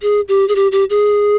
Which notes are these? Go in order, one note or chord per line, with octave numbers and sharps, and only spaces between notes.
G#4
G4
G#4
G4
G4
G#4